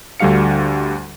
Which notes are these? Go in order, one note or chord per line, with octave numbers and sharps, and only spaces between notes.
D2 D3 G3 F#4 F5 C#7